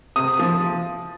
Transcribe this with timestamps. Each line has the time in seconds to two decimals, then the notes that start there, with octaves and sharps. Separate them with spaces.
0.16 C3 D#6
0.39 F3